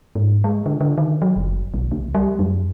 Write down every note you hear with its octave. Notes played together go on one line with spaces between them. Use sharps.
G#2
G#3
D3
D3
D#3
F#3
F#1
B1
C#2
G3
F#2